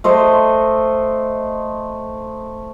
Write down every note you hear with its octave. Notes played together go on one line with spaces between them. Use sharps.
A3 C5 D#5